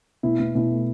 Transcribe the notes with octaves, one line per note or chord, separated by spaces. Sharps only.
B2 E4
B2
B2 E4
A3